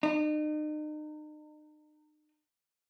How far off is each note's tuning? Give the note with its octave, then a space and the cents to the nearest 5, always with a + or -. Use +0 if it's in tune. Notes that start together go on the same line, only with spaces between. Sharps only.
D#4 -40